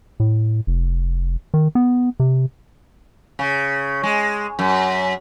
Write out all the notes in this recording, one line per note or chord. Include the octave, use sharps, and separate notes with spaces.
A2
F1
D#3
B3
C3
C#3
G#3
F#2